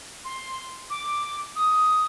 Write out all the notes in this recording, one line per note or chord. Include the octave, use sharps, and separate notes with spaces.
C6
D6
D#6